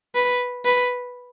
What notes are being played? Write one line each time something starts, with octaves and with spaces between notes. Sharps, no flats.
B4
B4